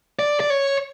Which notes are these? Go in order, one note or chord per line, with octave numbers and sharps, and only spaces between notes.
D5
D5
C#5